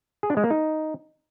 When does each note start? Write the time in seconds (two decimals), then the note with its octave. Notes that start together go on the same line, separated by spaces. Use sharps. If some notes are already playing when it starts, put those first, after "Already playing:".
0.23 G#4
0.30 D4
0.37 G#3
0.44 A#3
0.50 D#4